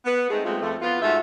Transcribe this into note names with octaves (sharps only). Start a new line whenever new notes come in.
B3
G#3 A3 C4 D#4 G#4
F#3 G#3 A3 C4 F4
F2 F3 A3
B3 F4
G#2 A3 F4 F#4 E5